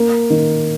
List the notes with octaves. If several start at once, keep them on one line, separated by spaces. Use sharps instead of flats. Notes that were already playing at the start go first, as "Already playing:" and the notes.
Already playing: A#3
D#3